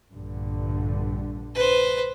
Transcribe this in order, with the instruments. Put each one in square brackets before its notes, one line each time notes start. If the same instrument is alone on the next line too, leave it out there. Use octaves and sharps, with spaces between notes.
[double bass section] A#1 G2 D3
[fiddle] B4 C5